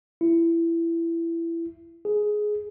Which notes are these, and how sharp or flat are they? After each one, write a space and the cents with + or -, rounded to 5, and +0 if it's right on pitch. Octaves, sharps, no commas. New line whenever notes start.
E4 +20
G#4 +10